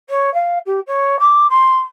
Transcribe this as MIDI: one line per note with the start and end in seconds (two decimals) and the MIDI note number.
0.09 0.32 73
0.34 0.58 77
0.66 0.80 67
0.87 1.19 73
1.19 1.47 86
1.49 1.77 84